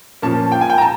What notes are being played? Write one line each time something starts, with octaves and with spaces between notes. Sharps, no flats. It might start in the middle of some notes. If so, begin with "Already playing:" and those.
A#2 F3 A#3 C#4 A5
G5
G#5
G5
A#5
A5